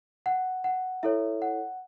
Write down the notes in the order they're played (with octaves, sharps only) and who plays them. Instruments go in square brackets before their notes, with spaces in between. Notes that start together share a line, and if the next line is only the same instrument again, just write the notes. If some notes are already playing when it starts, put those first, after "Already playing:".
[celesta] F#5
F#5
E4 A4 C#5 E5
F#5